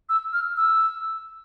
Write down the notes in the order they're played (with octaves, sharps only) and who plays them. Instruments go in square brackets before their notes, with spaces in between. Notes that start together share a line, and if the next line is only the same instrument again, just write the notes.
[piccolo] E6
F6
E6